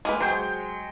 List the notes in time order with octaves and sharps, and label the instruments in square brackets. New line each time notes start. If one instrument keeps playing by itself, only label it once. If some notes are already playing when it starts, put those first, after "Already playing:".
[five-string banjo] G#3 A#3 B4
[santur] F#3 G#3 G5 [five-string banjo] C5